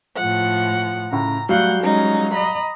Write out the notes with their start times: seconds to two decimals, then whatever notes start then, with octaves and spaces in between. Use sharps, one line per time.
0.16 A2 F3 F#5
1.12 A2 C#3 A#5
1.49 F#3 G3 A3 F5 F#5 G6
1.80 G#3 C#4 D#4
2.33 D#5 A#5 B5